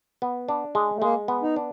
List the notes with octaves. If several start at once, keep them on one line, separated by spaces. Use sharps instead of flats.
B3
D4
G#3
A3
G#3 A#3
B3
D#4
D4